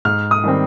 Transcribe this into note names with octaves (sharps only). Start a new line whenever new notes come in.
G#2 F6
D#6
D#3 G3 C4